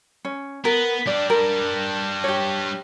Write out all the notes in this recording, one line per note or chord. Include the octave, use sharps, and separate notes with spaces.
C#4
B3 A#4
G3 D4 D5
A#4
G4 C#5